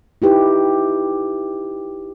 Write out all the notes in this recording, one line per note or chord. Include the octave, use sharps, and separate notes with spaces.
D#4 E4 G4 B4